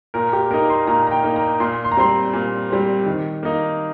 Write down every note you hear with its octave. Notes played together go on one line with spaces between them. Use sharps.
A#2 A#4
G4
A#3 D#4 A#4
C6
A#2 A#5
A#5
G5
A#3 D#4
A#5
A#2 C6
C6
A#5
G3 C4 C6
A#2
G3 C4
D#3
A#3 D#4